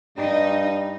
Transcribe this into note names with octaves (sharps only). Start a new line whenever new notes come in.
G2 G3 D#4